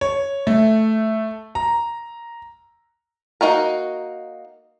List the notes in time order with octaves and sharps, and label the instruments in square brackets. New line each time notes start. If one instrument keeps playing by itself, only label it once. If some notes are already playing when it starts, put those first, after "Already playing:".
[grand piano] C#5
A3
A#5
[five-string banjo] A#3 D#4 F#4 A#4